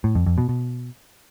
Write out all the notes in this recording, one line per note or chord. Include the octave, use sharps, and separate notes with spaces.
A2
F2
F2
B2
B2